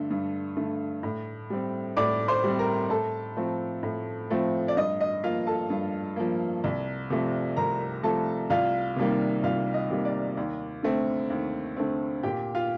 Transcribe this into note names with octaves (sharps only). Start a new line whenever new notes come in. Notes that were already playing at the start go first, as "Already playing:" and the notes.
Already playing: G2 D3 A3
G2
D3 A3
A2
G3 C4
A2 D5 D6
C5 C6
G3 C4
A#4 A#5
A2 A4 A5
F3 A3 C4
A2
F3 A3 C4
D5
G2 D#5
D#5
F3 A#3 F4 F5
A4 A5
G2
F3 A#3
C2
C3 F3 A3
C2 A#4 A#5
C3 F3 A3 A4 A5
C2 F4 F5
C3 D#3 G3 A#3
C2 F4 F5
D#5
C3 D#3 G3 A#3
D5
D#2
D3 A3 C4
D#2
D3 A3 C4
A#2 G4 G5
F4 F5